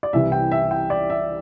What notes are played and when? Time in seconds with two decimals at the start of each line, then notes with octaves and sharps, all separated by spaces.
0.03 D5
0.13 C2 C3 E3 E5
0.32 G5
0.52 E5
0.71 G5
0.90 D5
1.10 E5